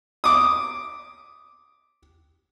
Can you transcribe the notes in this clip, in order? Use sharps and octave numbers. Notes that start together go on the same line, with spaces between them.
D6 D#6